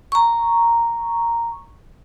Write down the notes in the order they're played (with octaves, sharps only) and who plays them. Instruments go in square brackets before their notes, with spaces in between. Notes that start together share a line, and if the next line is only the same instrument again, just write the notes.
[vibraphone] A#5 C#6